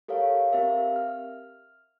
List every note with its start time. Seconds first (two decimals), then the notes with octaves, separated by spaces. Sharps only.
0.08 G4 A4 A#4 C#5 F5
0.52 C4 G4 A#4 E5 F5
0.96 F6